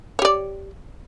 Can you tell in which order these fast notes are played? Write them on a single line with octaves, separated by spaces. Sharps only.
C#5 G4 D5